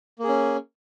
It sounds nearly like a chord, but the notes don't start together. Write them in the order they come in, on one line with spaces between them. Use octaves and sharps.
A#3 G#4 C#4